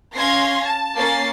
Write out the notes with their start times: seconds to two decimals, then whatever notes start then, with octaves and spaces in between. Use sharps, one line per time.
0.15 C#4 F5 C6 G#6 A#6 C7
0.64 A5
0.96 A#3 C#4 A6 C7